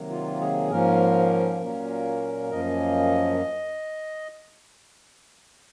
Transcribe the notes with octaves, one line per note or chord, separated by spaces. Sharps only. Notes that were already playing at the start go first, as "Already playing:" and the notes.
Already playing: C3 D#3 F#3 A#3
F4
G#4
G#2 F3 A#3 C#4 A#4
A#2 F#3 A#3 C#4
F#2 F3 A#3 C#4 D#5